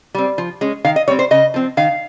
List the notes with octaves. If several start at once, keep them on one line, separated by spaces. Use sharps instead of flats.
G3 C4
F3
G#3 C#4
D#3 F5
D#5
G3 C4 C#5
C5
C#3 D#5
F3 C4
D#3 F5